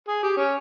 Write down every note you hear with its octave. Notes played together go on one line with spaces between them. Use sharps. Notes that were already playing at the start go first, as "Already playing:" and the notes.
G#4
G4
C#4